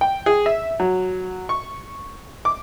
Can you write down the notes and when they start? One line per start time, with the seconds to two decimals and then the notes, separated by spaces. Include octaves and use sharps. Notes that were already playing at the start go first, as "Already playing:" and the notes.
0.01 G5
0.26 G#4
0.46 E5
0.80 F#3
1.49 C#6
2.45 D6